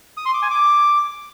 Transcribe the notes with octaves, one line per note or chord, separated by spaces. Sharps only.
D#6
C6
D6
G#5
D6